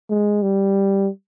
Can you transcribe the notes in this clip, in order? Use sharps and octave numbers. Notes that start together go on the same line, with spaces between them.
G#3
G3